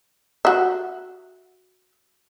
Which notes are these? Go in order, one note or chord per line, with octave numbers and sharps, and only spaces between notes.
F#4 E5